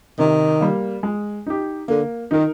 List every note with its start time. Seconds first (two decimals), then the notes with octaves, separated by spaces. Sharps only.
0.19 C3 D#3
0.61 G3 A#3
1.03 G#3
1.47 D#4 G4
1.88 D3 A#3
2.31 D#3 D#4 A#4